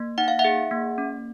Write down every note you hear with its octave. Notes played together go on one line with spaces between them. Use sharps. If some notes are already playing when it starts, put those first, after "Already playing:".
Already playing: A#3
D#4 F#5
F5
E5 F#5
G#4
A#3
C#4